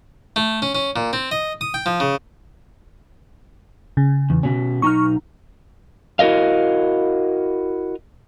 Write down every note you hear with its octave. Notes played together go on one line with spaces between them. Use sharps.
A3
C#4
C#4
A#2
C4
D#5
D#6
G5
F3
C#3
C#3
E2
B2 C#4
B1 D#4 A#5 C#6 F6
E4 F#4 A#4 D#5 F5